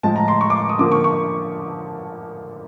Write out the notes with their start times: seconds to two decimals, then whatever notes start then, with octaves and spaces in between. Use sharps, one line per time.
0.03 A2 F3 G#3 A5
0.16 A#5
0.28 C6
0.41 C#6
0.50 D6
0.69 D#6
0.79 D3 F3 A#3 D6
0.92 C#6
1.04 C#6